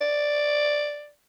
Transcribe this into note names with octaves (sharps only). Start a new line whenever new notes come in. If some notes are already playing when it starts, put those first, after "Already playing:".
D5